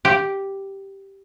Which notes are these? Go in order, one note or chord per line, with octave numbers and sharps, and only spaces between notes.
G4